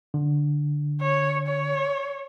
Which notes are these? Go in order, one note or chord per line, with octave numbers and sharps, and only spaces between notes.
D3
C#5
C#5